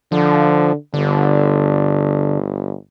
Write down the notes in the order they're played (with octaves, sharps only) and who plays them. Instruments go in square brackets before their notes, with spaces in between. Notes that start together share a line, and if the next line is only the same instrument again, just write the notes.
[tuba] D3 [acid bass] F3
[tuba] G1 [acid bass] D3